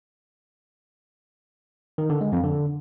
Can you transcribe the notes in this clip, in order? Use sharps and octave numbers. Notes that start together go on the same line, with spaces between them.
D#3
D3
G#3
F2
D3